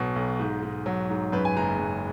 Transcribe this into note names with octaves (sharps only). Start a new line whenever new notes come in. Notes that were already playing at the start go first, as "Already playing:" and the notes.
Already playing: B1 B2 F#3
B1
G#2
G#2
F#3
G#2
F#2 B4
G#5
F#1 A#5
F#2